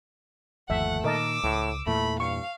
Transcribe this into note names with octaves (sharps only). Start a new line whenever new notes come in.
G1 D#2 F3 A3 E5 F#5
A#2 D#3 A#4 D#5 A5 D6 E6
C#2 A2
E2 A#2 E3 A3 B5
G2 F5 C#6